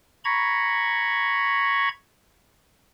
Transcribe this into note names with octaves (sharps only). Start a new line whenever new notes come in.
A#5 B5 C#6 G#6